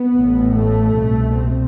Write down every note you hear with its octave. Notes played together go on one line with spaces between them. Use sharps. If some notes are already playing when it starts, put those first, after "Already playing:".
Already playing: B3
A1 A2
A3
C2 B2
C4